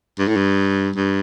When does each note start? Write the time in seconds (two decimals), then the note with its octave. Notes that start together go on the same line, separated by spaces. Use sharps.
0.19 G2
0.28 A2
0.36 G2
0.96 G2